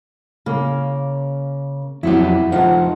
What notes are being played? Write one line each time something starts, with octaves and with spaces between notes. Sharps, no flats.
C#3 A#3
F2 F#3 B3 E4 G4
F2 F3 D#4 F4 F#5